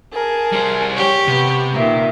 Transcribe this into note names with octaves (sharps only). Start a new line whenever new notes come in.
G#4 A#4 A5
G3 C5
G4 C#5 C#6
C3 B3
A#2 D#3 E5